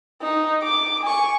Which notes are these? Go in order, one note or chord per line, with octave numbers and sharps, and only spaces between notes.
D#4
D6
G#5 C#6